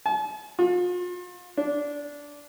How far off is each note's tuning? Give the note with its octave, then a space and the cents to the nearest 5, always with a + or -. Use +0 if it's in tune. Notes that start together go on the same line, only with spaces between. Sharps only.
A5 -45
F4 +40
D4 -15